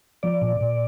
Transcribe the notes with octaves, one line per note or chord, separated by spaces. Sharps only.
F3 D5
A#2
A#2